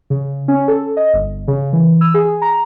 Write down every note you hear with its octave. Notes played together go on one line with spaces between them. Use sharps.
C#3
C#4
A4
D#5
G1
C#3
E3
E6
G#4
A#5